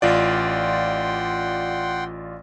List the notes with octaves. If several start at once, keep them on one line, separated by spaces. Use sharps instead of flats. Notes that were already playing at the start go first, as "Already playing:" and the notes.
A1 F4 D5 F#5 G5 C6